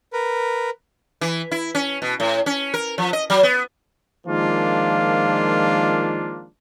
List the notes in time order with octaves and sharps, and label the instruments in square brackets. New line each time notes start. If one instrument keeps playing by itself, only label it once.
[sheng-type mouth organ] A#4 B4
[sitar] E3
E4
C#4
B2
A2
C#4
A#4
F3
D#5
F#3
B3
[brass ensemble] D#3 F3 G#3 A#3 D4 F4